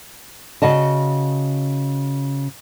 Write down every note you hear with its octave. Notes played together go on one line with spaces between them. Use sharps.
C#3 F#4 D#5 A5